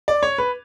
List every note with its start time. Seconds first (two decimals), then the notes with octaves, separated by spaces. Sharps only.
0.08 D5
0.23 C#5
0.38 B4